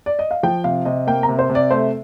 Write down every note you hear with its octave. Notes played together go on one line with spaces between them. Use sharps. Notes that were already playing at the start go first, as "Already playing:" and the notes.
D5
D#5
F5
F3 G5
C3 F5
C3 D#5
A#3 G5
A#5
C3
C5
C3
D5
A3 C5